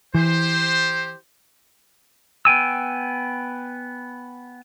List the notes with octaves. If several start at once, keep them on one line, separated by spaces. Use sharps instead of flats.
E3 G4 C5
B3 G5 G#5 E6